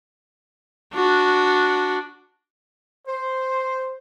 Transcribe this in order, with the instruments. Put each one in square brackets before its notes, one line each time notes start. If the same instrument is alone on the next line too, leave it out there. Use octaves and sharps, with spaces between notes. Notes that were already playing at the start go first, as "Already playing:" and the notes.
[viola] D4 F#4
[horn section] C5